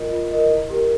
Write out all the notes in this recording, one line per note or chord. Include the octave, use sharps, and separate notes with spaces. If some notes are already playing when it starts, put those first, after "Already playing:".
Already playing: F4 A#4 D#5
F4
A#4 D#5
E4
G4 A#4